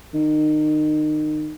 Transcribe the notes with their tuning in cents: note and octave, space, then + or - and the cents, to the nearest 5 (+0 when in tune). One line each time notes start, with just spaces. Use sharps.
D#3 -30